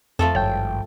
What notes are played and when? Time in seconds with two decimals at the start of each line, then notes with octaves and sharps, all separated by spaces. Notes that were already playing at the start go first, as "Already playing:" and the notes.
0.19 F2 F3 A3 A4
0.35 G#1 G2 C#5 G5